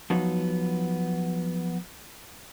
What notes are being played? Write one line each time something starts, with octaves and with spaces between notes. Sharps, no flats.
F3 F#3 B3 D#4 F#4